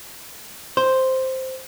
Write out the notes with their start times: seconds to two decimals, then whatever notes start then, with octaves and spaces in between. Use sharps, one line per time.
0.77 C5